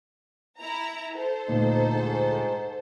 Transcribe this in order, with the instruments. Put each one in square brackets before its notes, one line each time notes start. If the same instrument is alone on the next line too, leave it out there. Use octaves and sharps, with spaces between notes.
[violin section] E4 A#5
A4 C5
[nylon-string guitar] D2 A#2 F5 [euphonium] D#4
[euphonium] G#2